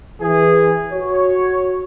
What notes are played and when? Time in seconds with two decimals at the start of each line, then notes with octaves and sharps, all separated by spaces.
0.21 E3 G#4
0.93 F#4 C#5